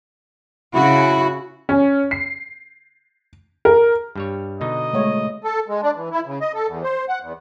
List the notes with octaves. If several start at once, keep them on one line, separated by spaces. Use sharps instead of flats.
C#3 E4 F#4
C#4
C7
A#4
G2 G3 C#5
B2 D3 D#4 D#5
G#3 A3 C#5
A4
G#3
D4
E3
E4
C#3
D#5
A4
E2
C5
F#5
E2